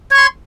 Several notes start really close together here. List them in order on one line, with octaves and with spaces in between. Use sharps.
C#5 C#6 C6